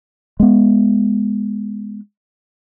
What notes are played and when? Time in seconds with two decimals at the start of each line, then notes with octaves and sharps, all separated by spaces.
0.40 G#3 B3